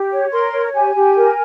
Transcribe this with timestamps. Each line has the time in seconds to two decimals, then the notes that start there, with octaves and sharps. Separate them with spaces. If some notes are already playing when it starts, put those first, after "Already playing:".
Already playing: G4
0.12 C#5
0.32 A#4 C6
0.53 C#5
0.74 G4 G#5
0.95 G4
1.17 A#4